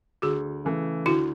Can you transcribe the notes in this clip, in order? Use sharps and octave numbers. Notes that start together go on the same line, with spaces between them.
D2 F#4 G#4
C#3 E3 A3
D2 E4 F#4